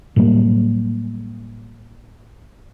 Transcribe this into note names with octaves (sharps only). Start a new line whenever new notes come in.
A2 F#3 G3 A#3